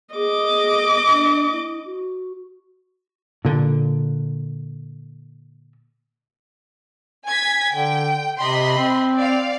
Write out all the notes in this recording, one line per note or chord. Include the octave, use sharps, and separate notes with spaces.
G#4 D#5 D6
D4
E4
F#4
A#2 D3
G#5 G#6 B6
D3 G5
C3 D#5 B5 C6
C4
D5 F5